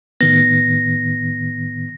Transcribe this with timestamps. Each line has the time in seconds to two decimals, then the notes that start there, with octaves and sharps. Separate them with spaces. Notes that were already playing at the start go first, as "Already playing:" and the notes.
0.21 A2 D#3 B3 A#6